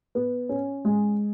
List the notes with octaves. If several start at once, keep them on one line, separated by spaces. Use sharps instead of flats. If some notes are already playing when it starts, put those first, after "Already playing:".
B3
C#4
G#3